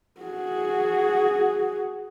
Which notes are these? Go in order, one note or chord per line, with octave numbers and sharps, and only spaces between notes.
F#4 G#4